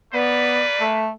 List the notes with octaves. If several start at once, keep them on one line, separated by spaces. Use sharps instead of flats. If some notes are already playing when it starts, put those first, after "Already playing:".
A#3 B3 B4 D5
A3